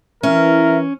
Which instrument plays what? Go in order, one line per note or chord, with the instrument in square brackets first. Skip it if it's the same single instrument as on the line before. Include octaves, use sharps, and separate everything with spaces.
[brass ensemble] E3 [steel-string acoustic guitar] C#4 [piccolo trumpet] A#4 [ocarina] E5